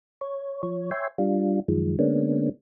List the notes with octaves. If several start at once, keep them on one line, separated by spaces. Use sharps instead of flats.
C#5
F3 C#5
C#5 E5 G5 G#5 C6
G3 D4 F4
F#2 D#3 F3 G#3
D3 G#3 A#3 B3 C#4 D4